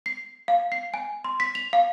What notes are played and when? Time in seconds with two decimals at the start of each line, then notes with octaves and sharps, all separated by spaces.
0.06 C7
0.48 F5
0.72 C7
0.94 G#5
1.24 C6
1.40 B6
1.55 F7
1.73 F5